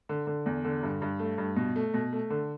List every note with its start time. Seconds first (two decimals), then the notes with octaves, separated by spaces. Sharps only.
0.09 D3
0.27 D3
0.46 E2
0.64 D3
0.83 G2
1.02 G2
1.19 A3
1.38 G2
1.56 B2
1.76 A3
1.94 B2
2.13 A3
2.30 D3